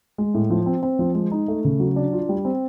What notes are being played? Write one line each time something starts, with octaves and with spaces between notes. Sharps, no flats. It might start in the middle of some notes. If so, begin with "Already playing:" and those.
G#3
A2
F3
C4
C4
F3
G#3
D#4
A3
C#3
F#3
D4
F4
G3
C4